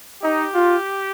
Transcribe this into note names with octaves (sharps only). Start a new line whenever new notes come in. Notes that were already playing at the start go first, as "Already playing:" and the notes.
D#4 G4
F4